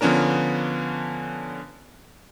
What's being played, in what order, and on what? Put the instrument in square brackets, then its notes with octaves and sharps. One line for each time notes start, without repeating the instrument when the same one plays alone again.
[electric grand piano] D3 F3 B3 C#4 D4 A#4